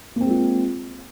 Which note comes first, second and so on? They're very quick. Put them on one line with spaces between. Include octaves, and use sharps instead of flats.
A#3 C4 G#3 F4